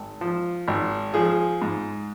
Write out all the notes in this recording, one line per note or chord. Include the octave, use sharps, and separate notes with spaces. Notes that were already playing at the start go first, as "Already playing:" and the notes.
Already playing: G#1
F3
G#1
F3 G#4
G#2